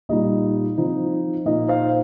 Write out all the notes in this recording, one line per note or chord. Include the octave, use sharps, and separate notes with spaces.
A#2 G3 D#4 D#5
F3 C4 D#4
A#2 A#3 D#4 D#5
C5 F5